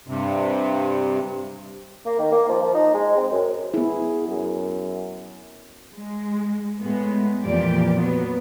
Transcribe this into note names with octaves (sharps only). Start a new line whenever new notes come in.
G2 C3
A#3
D#3
A#3
F3
F3
D#4
G#3
C4
F#2
B3 E4 G#4
F#2
G#3
A2 G#3 B3
F2 A#2 E3 G4 D5
F#3 B3